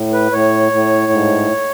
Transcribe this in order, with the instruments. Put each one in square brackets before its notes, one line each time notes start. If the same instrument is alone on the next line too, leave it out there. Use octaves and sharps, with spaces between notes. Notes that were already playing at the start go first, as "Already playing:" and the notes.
Already playing: [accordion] A2
B4
A2 C#5
A2
G#2